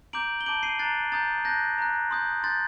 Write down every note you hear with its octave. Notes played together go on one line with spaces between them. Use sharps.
A#5 D6 G6 D7 F#7
G7
A5 D6 G6 D7 F#7
C7 D#7
A#5 F#6 A6 C7
A#5 D#6 G6 A6
A5 D#6 F#6 G6 A#6
A#5 F#6
C6 D#6 G6
C6 G6 A6